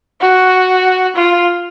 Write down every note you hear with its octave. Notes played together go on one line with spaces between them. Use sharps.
F#4
F4